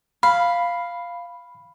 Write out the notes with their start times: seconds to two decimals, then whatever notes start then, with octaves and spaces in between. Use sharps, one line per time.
0.23 F5 B5